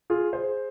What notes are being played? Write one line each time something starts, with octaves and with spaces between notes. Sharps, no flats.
F4 G#4
G#4 C5